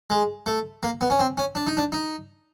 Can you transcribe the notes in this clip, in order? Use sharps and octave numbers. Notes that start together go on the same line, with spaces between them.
G#3
A3
A#3
B3
C#4
C4
C#4
D4
D#4
D4
D#4